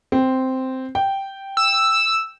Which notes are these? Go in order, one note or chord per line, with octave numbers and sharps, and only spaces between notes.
C4
G5
E6